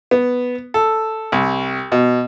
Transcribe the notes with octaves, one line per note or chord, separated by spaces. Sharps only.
B3
A4
C2
B2